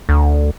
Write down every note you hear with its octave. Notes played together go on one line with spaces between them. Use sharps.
D2